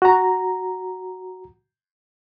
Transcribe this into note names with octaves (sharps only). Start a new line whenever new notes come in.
F#4 A#5